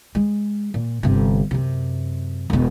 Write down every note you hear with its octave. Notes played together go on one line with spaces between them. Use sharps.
G#3
A#2
G1 C3
F#2 C3
E1 B2